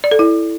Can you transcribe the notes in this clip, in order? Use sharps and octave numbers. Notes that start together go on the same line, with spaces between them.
D5
A4
E4